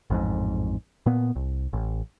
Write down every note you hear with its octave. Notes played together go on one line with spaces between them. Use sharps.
A1 F2 G#2
A#2 B3
C2
A1